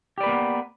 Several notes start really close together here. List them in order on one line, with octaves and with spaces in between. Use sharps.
G4 D5 B4 A#3 B3